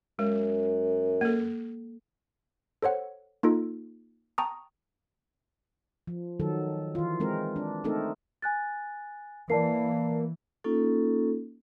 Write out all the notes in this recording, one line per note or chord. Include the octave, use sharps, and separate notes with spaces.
F#2 G#3
A#3 A4
A4 C5 C#5 F#5
A#3 D#4 F4 A4
G5 A5 A#5 C#6 D#6
F3
D#3 F#3 A4
E3 F4
G#3 C4 A#4
D4
A3 C4 D#4 A4 A#4
G#5 F#6 A6
E3 A#3 D5 A5 C7
A#3 C#4 D#4 F4 A4